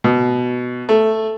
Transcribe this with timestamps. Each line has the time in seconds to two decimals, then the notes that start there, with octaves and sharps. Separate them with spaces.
0.04 B2
0.89 A3